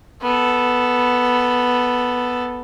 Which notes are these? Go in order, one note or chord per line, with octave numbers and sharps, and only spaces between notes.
B3 A4